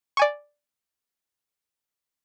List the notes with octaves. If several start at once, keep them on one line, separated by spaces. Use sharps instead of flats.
D5 G#5 C#6